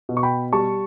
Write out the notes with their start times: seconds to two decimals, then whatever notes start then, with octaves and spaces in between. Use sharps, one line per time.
0.09 B2
0.17 C#6
0.23 G5 B5
0.53 G3 A5 C#6